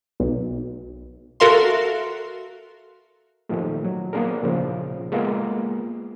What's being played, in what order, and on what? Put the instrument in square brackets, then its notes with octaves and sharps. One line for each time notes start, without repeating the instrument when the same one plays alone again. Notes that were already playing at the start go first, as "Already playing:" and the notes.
[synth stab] B1
F#4 A4 A#4 E5 F5 C6
[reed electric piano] A#2 D#3 F3 A3
F#3
A#3 B3 D4 G#4 A#4
A#2 C#3 F3
G#3 A#3 B3 F4